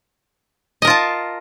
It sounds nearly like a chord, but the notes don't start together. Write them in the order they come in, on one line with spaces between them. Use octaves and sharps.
D#5 A#4 F4 A5